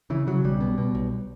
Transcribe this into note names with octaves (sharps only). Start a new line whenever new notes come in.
C#3 E3
C#3 F#3
B1 G3
B2
B2
B1